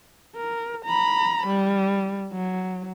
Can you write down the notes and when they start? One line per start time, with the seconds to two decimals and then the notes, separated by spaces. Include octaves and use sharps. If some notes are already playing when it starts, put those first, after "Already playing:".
0.36 A#4
0.85 A#5 B5
1.47 G3
2.32 F#3